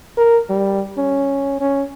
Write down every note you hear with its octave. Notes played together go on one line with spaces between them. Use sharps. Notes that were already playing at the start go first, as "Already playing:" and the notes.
A#4
G3
C#4
C#4